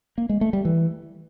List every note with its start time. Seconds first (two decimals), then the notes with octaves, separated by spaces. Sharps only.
0.18 A#3
0.29 G#3
0.41 A3
0.53 G3
0.65 E3